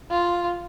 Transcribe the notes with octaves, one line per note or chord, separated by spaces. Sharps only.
F4